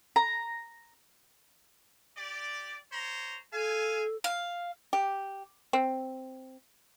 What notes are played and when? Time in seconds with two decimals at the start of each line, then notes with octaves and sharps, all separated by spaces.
0.16 A#5
2.17 G4 D5
2.92 C5 C#5 A#5
3.53 A4 F5 G#5
4.24 F5
4.93 G4
5.73 C4